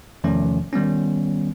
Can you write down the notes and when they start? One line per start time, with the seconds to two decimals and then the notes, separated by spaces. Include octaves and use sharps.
0.24 E2 C3 D#3 F3 A3 C#4
0.73 D#3 G3 B3 C#4